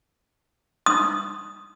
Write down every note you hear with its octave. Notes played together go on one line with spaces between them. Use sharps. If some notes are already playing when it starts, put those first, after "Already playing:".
D#6